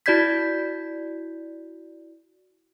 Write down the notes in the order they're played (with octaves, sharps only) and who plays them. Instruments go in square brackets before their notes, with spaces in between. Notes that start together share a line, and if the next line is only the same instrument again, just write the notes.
[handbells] E4 F#4 D5 G6 G#6 B6